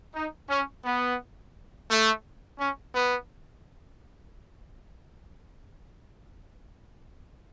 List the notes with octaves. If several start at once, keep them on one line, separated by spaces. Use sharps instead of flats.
D#4
C#4
B3
A3
C#4
B3